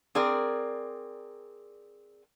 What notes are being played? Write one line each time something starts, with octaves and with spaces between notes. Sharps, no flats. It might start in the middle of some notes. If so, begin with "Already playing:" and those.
C4 G#4 A#4 D5